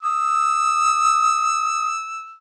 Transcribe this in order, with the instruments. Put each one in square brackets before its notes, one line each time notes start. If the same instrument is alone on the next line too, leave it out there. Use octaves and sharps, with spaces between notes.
[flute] D#6 [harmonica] E6